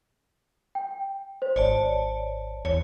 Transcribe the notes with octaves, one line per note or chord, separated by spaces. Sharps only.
G5
C5
G#1 C#5 D5 A5
E2 C#5